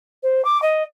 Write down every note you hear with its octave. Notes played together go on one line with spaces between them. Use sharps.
C5
D6
D#5